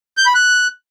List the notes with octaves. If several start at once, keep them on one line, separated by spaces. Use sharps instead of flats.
G6
B5
F#6